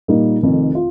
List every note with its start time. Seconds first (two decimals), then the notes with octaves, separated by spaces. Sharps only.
0.08 A#2 G3 A#3 D#4 A#4
0.42 F1 F2 D#3
0.75 F4